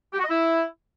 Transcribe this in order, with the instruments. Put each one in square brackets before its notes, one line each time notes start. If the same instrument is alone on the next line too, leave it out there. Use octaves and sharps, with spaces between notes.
[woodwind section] G4
F#4
D#5
E4